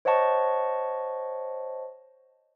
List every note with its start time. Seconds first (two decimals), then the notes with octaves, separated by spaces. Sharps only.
0.05 C5 C#5 D#5 F#5 A5 C#6